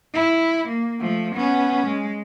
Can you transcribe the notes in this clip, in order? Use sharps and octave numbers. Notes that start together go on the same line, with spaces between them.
E4
A#3
F3 A3
B3 C#4
G#3